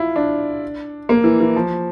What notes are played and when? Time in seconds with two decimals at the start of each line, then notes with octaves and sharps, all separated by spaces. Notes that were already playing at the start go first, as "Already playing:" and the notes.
Already playing: E4 F4
0.16 D4
1.09 A#3
1.24 E3
1.40 E3
1.56 F3